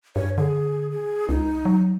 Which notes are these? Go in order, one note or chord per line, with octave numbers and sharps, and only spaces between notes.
G2 C#5
D3 G#4
G#4
C#2 D#4
F#3